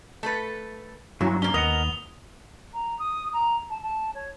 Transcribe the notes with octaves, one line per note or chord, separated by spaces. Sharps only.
A3 A4 B4
G2 F#3 A#3 C#4 E4 F#4
A#3 C#4 D4 G7
D#2 B3 A#4 D#5 F#5 D#6 F7
A#5
D#6
A#5
A5
A5
C#5